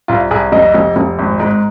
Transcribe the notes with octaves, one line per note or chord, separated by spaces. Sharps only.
C2 F4
C2 G#4
F1 D#5
F1
F1
G#1
G#2